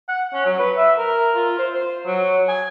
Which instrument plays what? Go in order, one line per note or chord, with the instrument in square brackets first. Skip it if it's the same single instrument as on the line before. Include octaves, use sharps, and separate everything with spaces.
[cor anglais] F#5
C#4
F#3
B4
E5
A#4
F4
C5
C5
F#3
G#5